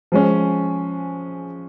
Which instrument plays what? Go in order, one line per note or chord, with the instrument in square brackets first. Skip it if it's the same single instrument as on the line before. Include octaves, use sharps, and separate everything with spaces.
[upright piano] F3 G#3 C#4